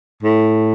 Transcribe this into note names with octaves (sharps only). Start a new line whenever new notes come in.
A2